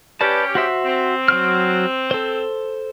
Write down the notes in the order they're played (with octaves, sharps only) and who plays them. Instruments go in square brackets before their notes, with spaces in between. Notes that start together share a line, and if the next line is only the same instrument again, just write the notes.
[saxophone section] C#4 G4 [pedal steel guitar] B4 D5 A5
[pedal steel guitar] F#4 C5 E5
[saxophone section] C4
[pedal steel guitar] F#3 F#4 F6
A4 C5